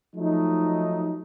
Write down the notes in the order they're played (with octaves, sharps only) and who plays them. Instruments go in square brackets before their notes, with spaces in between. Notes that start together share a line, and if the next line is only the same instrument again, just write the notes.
[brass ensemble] F3 F#3 A3 D#4